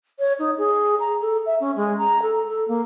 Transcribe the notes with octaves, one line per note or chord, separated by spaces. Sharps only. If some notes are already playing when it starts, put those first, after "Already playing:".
C#5
D#4
G#4
A#5
A4
E5
C#4
G#3
A#5
A4
A4
A#3